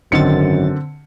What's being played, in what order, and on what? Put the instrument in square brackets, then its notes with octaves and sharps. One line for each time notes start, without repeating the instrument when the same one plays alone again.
[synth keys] G#1 D#3 A6 [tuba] F#2 [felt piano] D3 C4 C#7